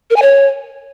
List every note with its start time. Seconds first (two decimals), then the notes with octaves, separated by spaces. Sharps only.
0.10 A#4
0.16 G#5
0.22 C#5